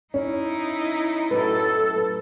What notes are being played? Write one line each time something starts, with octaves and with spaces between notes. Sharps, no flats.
C#4 D#4 E4
F#2 A2 A4 B4